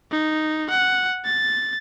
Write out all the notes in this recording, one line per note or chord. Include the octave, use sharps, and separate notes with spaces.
D#4
F#5
A6